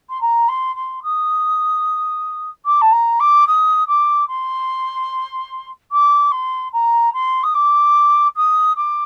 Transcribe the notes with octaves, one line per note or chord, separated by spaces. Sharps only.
C6
A#5
C6
C6
D#6
D6
A5
A#5
D6
D#6
D6
C6
D6
C6
A#5
C6
D#6
D6
D#6
D6